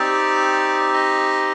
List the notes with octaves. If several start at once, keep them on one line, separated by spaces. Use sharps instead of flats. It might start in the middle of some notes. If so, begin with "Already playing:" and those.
Already playing: C4 D#4 G4 D5
D#5